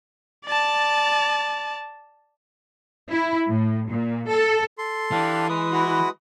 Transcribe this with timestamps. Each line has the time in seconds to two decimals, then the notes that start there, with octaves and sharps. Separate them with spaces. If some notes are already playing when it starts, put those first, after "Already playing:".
0.45 D5 A5
3.10 E4
3.48 A2
3.87 A#2
4.29 A4
4.78 A4 C6
5.12 E3 D4 G4 F5
5.49 G#3 B4 D#6
5.72 E4 F#4